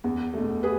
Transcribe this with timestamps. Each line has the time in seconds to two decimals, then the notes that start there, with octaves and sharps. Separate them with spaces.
0.04 E2
0.34 B2 A3
0.63 G#4 B4